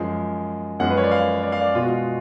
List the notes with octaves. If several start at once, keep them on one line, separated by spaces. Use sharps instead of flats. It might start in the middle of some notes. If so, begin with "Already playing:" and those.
Already playing: F#2 F3 G#3
F#2 F3 G#3 F#5
B4
C#5
D5
F5
D5
F5
D5
B2 G#3 F4
F#4
F4